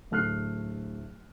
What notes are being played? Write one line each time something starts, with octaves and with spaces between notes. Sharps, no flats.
D1 A3 F6 F#6 C7